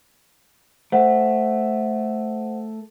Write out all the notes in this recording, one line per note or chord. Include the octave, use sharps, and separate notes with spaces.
A3 C5 F#5